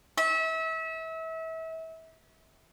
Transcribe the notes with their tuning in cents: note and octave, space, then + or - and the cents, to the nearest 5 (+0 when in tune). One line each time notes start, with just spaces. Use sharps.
E5 -30